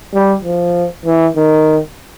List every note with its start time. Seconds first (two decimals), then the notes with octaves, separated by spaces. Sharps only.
0.14 G3
0.44 F3
1.06 E3
1.36 D#3